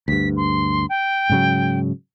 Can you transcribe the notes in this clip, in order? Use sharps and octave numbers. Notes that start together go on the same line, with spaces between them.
D2 G2 B6
C6
G5
G#2 C#3 F#3